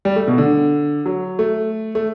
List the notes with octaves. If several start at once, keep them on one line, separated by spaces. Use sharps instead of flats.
G3
A3
B2
D3
F#3
A3
A3